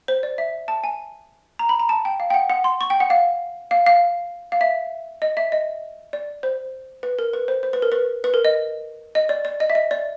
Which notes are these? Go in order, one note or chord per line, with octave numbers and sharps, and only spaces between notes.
C5
D5
E5
A5
G#5
A#5
B5
A#5
A5
G5
F5
G5
F#5
F#5
C6
C#6
G5
F#5
F5
F5
F5
F5
E5
D#5
E5
D#5
D5
C5
B4
A#4
B4
C5
C5
B4
A#4
B4
B4
A#4
D#5
D#5
D5
D5
D#5
E5
D#5
D5